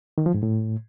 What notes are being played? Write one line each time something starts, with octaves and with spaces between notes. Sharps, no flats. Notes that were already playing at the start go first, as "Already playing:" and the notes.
D#3
F3
G#2
A2